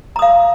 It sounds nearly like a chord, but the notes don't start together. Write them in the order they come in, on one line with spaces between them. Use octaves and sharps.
A#5 D#6 F5